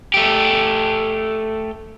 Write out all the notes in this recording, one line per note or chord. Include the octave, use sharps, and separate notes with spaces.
A3 G4